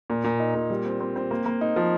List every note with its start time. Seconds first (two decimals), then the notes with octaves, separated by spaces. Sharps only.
0.10 A#2
0.24 A#2
0.40 D#4
0.55 A#2
0.70 G3
0.86 C4
1.01 C4
1.16 C4
1.31 A#3
1.46 A#3
1.61 D#4
1.76 F3